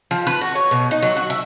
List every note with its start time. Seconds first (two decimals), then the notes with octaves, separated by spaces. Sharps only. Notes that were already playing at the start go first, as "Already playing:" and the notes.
0.11 F3
0.27 B4
0.41 F#4
0.55 C#5
0.71 B2
0.91 D#4
1.02 F#3
1.16 F#4
1.30 E5